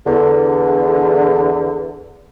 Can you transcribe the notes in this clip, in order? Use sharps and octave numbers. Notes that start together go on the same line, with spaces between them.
E2 D3